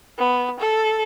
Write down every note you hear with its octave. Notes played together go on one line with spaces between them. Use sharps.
B3
A4